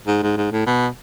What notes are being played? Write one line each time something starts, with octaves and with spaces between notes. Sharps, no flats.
G#2
G#2
G#2
A2
B2